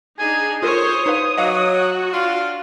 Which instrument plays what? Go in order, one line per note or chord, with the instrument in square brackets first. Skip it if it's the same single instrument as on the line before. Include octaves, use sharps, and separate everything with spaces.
[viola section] D4 D#4 G#4 [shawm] G#5
[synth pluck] F4 A4 A#4 [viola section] C5 C#5 [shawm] D#6
[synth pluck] D#4 B4 F5
[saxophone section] F#3 [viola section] F#4 [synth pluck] D#5 F5 D6
[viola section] F#4
[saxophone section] D4 F4